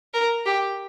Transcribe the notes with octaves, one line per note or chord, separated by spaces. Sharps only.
A#4
G4